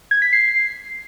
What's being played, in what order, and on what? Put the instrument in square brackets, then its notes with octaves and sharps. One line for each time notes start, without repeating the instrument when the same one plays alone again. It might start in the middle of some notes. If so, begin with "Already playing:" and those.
[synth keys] G#6
B6
C7